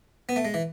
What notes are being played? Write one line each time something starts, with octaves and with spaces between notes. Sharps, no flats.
B3
A3
G#3
E3